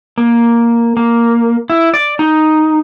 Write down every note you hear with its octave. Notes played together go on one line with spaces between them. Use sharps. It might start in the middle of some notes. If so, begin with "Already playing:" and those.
A#3
A#3
E4
D5
D#4